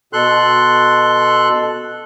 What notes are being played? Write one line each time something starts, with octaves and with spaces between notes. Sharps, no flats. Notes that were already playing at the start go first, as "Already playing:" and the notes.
B2 A4 C6 F#6